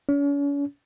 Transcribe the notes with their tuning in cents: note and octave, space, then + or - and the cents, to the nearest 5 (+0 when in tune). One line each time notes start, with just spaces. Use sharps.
C#4 +40